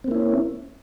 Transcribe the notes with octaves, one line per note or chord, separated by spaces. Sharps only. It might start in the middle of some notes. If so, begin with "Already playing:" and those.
A#3 C4 C#4 E4